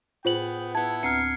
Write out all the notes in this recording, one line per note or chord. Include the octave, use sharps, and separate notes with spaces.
A2 B3 F4 G#4 C5 G5 F#7
B3 E4 A5 G#6
D2 C4 A#5 F6 C7 C#7